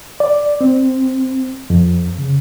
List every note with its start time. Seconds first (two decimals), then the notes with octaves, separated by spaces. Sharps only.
0.20 D5
0.61 C4
1.70 F2
2.18 C#3